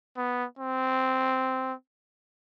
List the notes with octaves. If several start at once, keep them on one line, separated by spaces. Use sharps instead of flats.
B3
C4